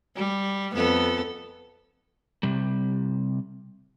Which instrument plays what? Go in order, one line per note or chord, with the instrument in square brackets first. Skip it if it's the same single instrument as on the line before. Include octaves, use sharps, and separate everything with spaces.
[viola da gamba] G3
F2 B3 A4
[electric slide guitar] C3 G3